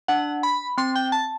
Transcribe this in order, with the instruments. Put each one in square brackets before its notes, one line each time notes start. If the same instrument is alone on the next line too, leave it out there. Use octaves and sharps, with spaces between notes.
[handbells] D4 [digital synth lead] F#5
[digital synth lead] B5
[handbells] C4 [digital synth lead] C6
[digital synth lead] G5
A5